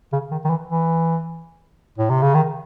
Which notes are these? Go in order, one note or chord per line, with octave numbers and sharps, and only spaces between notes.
C#3
D#3
D#3
E3
E3
A2
C3
C#3
D#3